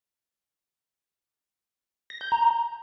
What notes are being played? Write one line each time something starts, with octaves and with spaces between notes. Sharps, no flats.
A#6
G6
A#5